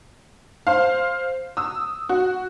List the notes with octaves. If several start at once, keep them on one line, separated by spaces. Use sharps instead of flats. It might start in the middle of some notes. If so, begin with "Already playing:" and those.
C5 F5
D#6 E6
F#4